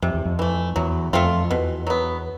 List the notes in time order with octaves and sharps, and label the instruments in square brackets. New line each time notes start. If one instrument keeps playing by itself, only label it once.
[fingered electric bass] F2 [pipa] C3
[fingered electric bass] E2
F2
[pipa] E3 A3
[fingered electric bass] E2 [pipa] F#3
[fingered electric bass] F2 [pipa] A3 C4 F4
[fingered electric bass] E2 [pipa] B2
[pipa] F#3 B3